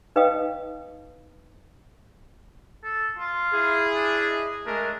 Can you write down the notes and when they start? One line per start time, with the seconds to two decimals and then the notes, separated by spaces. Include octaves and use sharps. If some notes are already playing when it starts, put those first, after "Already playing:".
0.16 D#4 B4 D#5 F5 G5 D#6
2.84 A4
3.18 F4
3.54 E4 G#4
3.95 D4
4.29 D#5
4.66 G#3 A3 D4 A#4